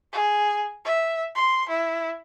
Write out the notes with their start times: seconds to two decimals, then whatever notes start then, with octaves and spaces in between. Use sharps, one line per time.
0.13 G#4
0.85 E5
1.35 C6
1.69 E4